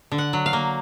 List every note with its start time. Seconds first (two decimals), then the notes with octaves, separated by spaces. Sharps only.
0.12 D3
0.18 F#5
0.33 F#3
0.46 F5
0.53 A#3